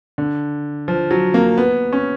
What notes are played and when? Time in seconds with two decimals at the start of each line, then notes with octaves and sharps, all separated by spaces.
0.18 D3
0.88 F3
1.11 F#3
1.34 A#3
1.58 B3
1.93 C#4